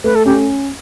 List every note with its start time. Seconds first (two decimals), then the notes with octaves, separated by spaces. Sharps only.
0.04 A3 B4
0.15 A4
0.26 C#4 G4